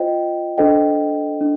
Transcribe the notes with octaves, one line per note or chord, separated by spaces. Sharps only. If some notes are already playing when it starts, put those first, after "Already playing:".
Already playing: F4 C5 D#5 G5
D4 A4 C5 D#5 G5
D4